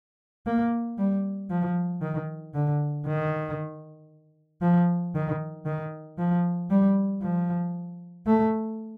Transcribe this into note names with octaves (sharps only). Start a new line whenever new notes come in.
A#3
G3
F3
D#3
D3
D#3
F3
D#3
D#3
F3
G3
F3
A3